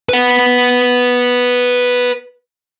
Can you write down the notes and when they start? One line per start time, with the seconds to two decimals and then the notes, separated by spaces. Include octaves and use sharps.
0.09 B4 F#5